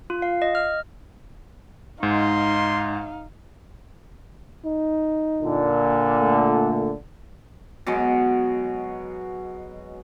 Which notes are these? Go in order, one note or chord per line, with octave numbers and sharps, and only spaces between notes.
F4
F5
D#5
F6
G#2 D#4 F5 C6
D#4
A#2 D3
A3
B2 F#3 G#3